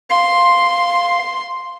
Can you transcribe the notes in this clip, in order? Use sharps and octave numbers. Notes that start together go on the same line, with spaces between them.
F5 C6